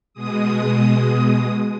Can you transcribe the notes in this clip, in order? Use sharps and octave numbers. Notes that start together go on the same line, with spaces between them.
B2 G#3 D#6